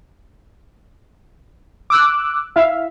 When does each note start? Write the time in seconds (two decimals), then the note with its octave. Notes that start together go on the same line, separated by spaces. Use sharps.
1.90 D6 E6 F#6
2.56 E4 E5 F5